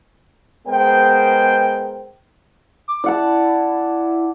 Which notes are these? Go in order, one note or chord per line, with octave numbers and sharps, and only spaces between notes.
G#3 B3 A#4 C5 G5
D6
E4 D5 F#5 A5